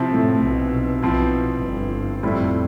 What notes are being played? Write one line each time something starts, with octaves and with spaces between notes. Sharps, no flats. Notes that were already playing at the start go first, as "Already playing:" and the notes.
Already playing: C3 F3 C4 E4
A2 A3
B1 B2
B1 B2 F3 C4 E4
G1 G2
F2 A2 G3 C4 E4